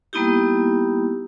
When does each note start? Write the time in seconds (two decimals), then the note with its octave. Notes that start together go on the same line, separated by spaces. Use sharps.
0.13 G3 A#3 B3 D#4 E4 G4